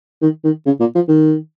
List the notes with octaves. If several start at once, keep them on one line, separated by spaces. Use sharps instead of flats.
D#3
D#3
C#3
A#2
F3
D#3